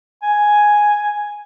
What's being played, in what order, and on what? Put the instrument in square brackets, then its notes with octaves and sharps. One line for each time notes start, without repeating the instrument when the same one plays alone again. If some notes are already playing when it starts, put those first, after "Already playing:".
[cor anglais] G#5